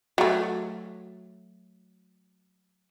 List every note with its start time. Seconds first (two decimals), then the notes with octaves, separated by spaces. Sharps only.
0.18 F#3 A3